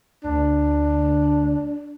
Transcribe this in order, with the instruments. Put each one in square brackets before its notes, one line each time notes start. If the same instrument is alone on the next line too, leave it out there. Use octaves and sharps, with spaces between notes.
[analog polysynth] D2 [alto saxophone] D4